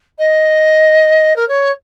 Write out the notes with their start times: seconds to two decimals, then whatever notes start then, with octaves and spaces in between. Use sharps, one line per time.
0.19 D#5
1.36 A#4
1.48 C#5